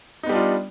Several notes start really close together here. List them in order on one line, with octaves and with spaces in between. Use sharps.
D#4 B3 G3 D4 F4